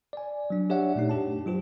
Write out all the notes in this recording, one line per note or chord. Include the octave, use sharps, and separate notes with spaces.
D5 G#5
F#3 D4
D4 G4 C#5 D5 E5 F#5
A#2 A3 D#4
F#2 D4 G4 A5
F#3 F4 G4 C5